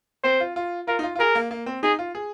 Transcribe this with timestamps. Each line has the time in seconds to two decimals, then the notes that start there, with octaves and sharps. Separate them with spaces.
0.24 C4 C5
0.40 F4
0.56 F4
0.87 F4 A#4
0.99 D#4
1.03 F4
1.15 F4
1.19 G#4 A#4
1.35 A#3
1.51 A#3
1.66 C4
1.83 D#4 G#4
1.99 F4
2.15 G#4